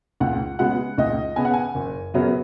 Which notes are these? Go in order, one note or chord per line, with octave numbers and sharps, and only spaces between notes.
C#2 F#5
C#3 G#3 B3 F#5
C#2 D#5
C#3 B3 G#5
F#5
G#5
F#1
F#2 C#3 F#3 B3